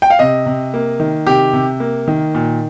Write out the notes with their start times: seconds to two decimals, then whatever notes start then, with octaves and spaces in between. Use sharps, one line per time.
0.02 G5
0.10 F5
0.19 C3 D#5
0.46 C3
0.74 A#3
1.00 D#3
1.27 C3 G4
1.53 C3
1.80 A#3
2.08 D#3
2.35 A#2